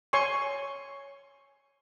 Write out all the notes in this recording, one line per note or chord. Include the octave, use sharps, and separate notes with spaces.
C#5 G#5 C6 C#6